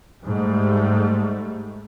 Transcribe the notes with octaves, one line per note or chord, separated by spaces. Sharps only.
G#2 G3 A3